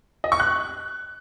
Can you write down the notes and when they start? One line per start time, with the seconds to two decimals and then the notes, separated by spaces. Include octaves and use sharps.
0.24 D#5
0.32 C#6
0.40 F#6